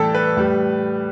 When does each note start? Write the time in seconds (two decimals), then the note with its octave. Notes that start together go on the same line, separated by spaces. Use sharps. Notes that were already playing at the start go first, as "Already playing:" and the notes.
Already playing: A2 E3 G3 A4 G5 A5
0.14 B4
0.37 A2 G3